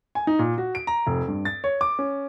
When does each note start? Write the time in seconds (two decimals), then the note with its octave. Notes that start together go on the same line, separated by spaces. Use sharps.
0.15 G#5
0.27 D#4
0.39 A#2
0.58 F#4
0.75 D7
0.87 A#5
1.07 F1
1.28 G2
1.45 A6
1.64 C#5
1.81 D6
1.99 C#4